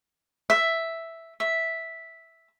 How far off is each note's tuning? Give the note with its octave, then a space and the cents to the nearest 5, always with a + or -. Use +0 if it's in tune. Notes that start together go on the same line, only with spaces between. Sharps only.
E5 +0
E5 -5